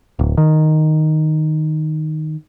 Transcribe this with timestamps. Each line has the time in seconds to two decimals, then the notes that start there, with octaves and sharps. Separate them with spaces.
0.19 D1
0.37 D#3